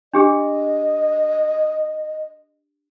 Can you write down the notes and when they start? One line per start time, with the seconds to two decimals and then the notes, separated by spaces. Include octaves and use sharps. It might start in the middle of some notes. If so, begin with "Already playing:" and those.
0.14 D4 G4 G#4 D#5